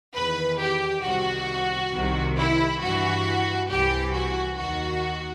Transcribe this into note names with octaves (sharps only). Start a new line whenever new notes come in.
E2 D#3 B4
G4
C2 C3 D#3 F#4
C2 C3 D#3
E4
G2 E3 F#4
C2 C3 E3 G4
F#4
D#2 D#3 F#4